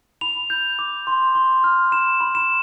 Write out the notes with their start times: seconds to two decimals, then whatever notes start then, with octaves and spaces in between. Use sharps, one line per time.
0.21 B5 F7
0.50 G6
0.79 D6
1.07 C6
1.35 C6
1.64 F6
1.92 B5 E7
2.21 B5
2.35 E7